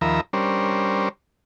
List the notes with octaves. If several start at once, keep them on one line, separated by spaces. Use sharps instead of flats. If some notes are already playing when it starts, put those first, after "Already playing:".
D#2 F3 A#4 E5 A#5 B5
G3 C#4 D4 A#4 C5